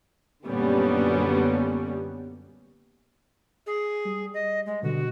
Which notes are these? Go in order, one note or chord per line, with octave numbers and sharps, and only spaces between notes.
F#2 A#2 D3 G3 B3 C#4
G#4
G3
D#5
G#3
B2 D3 G3 F#4